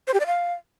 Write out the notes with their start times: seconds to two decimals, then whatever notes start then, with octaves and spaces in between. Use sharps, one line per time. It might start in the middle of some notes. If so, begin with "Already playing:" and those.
0.07 C5
0.14 G4
0.20 D5
0.27 F5